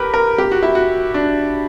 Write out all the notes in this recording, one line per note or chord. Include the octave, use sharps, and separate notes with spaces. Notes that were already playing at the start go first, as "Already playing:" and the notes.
Already playing: G4 A#4 B4
A#4
G4
F#4
E4
F#4
D4